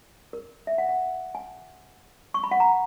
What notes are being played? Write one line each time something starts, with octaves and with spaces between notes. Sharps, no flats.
A#4
E5
F#5
F#5
G#5
C#6
B5
F#5
A#5